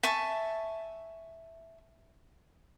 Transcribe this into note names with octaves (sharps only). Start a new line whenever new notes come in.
E5 G#5 A5 C#6